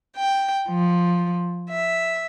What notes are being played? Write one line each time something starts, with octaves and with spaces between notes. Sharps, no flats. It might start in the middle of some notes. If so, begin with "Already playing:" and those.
G5
F3
E5